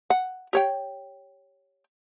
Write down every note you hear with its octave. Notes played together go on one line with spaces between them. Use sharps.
F#5
G4 C#5 G5